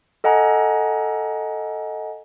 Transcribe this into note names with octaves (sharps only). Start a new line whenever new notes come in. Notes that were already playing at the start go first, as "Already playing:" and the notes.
A4 D#5 F#5 G#5 A#5